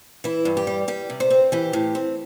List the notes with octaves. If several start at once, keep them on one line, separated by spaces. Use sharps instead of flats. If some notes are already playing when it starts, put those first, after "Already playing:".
E3 E4
G2
G4
G3
G3 G4
C3
C5
C4
E3 G4
A2
C4